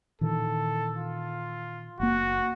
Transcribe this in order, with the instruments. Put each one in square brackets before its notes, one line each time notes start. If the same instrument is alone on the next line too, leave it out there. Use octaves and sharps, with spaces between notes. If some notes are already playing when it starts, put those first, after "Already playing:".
[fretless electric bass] A#2 D#3 E3 [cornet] A4
[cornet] F4
[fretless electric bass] F#1 A#3 [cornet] F#4